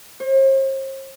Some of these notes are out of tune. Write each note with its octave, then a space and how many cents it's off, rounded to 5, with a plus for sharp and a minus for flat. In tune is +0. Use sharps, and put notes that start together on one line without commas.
C5 +45